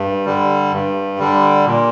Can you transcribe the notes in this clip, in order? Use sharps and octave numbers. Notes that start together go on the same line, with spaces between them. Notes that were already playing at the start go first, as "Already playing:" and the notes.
Already playing: G2
D3 G3
G2
D3 G3
A#2